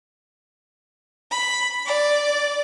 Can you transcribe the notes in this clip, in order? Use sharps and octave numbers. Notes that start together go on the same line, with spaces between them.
B5
D5